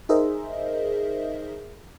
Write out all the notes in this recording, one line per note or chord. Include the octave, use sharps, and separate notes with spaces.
D#4 G#4 A#4 C5 D#5 E5